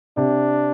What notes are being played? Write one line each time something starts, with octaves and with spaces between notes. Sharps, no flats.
C3 D4